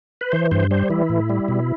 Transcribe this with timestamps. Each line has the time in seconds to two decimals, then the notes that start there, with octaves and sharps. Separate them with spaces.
0.21 B4
0.32 E3 C5
0.51 G2 C5
0.71 G3 C5
0.90 E3 E4
1.09 A2
1.29 G3
1.48 B2